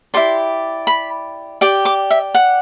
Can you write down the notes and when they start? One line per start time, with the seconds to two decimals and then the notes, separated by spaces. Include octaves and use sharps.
0.14 E4 G4 D5 C6
0.87 B5
1.61 G4 D5 D6
1.85 D6
2.10 E5
2.35 F#5